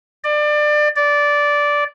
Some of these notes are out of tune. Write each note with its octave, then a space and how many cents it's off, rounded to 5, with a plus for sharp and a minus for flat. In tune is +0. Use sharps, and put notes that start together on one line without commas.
D5 +25
D5 -10